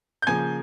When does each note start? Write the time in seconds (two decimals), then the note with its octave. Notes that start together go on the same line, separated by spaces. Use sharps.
0.22 G6
0.27 C#3 F3 A#3 G#5 G#6